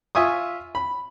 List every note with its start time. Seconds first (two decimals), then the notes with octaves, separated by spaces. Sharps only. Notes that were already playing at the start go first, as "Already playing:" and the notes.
0.15 F4 E5 G#5 C#6 D#6
0.75 B5